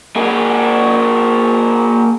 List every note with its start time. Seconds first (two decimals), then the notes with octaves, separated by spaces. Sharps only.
0.16 A#3 G#4